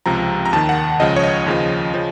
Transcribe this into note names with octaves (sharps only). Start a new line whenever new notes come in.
C#2 C3 F3 A#5
A#5
D#2 D#3 A5
F#5
C#2 C#3 F3 D#5
C#5
D#5
D#2 C#3 F3
C#3 F3